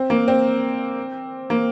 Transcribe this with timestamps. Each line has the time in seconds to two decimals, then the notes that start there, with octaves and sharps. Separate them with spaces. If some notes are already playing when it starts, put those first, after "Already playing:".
Already playing: C4
0.10 A#3
0.28 C4
1.50 A#3